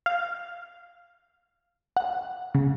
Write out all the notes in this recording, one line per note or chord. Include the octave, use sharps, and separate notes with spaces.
F5
F#5
C#3